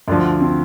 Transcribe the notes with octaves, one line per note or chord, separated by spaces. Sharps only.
D2 D3 F3 D4
C4